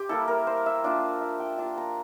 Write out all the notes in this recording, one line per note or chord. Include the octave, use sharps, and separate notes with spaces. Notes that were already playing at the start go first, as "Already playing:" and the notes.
Already playing: G4 C5
G3 A#3 E4 A4
A#4
C5
E5
A#3 D4 F4 D5
E5
G5
A#3 D4 F4 A5
A#5